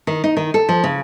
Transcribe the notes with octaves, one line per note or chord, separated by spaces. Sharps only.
D#3
D#4
D#3
A4
F3
C#3